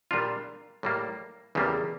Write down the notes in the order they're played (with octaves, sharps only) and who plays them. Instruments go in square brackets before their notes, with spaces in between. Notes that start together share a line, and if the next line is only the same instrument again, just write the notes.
[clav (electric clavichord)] A#2 G3 D4 F4
A2 G3 A#3
E2 C#3 G3 A#3